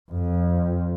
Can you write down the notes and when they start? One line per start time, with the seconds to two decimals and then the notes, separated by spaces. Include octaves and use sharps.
0.12 F2